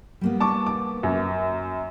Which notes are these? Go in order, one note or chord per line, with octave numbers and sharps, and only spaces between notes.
G3 A#3 B3
A5 C#6 D6
D6
F#2